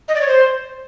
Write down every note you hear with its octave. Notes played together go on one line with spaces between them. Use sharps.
D#5
D5
C#5
C5